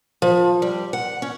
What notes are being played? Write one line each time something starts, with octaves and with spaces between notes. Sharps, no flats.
F3
G3
F#5
C#4